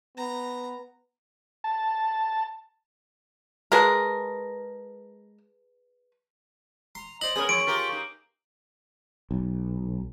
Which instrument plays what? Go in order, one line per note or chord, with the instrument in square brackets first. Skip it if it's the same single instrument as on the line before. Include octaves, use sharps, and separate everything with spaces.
[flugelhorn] B3 [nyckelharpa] A#5
[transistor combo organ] A5
[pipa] G#3 A#4 [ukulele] G#4 B4 A5
[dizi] A#5 [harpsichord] C6
[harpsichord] C5 D#5 [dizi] D5 [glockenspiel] F#7
[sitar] B3 C#4 A#4 [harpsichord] G#4 [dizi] D#6
[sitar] F3 [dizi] C#6 [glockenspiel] D7
[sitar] F4 G4 A#4
A#3 D#4
[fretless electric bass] B1